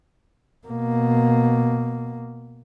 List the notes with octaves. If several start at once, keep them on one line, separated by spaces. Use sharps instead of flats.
B2 A#3